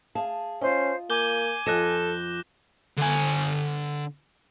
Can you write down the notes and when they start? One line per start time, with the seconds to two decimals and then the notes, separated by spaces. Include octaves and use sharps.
0.15 G#4 F5 A5
0.61 C#4 F4 C5 D#5
1.10 A#3 G#5 D6 G6 G7
1.66 F2 F3 A4 D#5 F#6 A#6 E7
2.98 D3 G#5